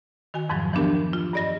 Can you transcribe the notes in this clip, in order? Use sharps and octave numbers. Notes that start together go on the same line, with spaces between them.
D#3 F#4 G#5
F2 G#2 D#3 F3 F#3
E3 F3 B3 D4 G4 A#4
F4
G2 G#4 D5 D#5 A#6